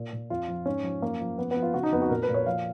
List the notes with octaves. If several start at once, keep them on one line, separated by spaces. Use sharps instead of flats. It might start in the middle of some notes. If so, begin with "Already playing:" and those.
Already playing: A#2
A#2
F2 F4
F3
G#2 C#4
F3
F#2 A#3
F3
F3 B3
F3 B3
F4
C#3 F#4
D#4
F2 B3
F#4
A#2 A#4
B4
A#2
C#5
F3 F5